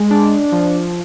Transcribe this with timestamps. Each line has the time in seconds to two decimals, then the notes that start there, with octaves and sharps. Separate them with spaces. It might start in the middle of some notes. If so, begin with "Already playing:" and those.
Already playing: G#3
0.11 D4
0.52 F3